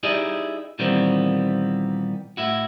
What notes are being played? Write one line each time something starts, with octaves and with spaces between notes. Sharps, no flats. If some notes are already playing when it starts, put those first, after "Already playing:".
D#4 E4 G4 G#4 D5 D#5
A#2 D#3 E3 G3 B3 C4
A2 E4 F#4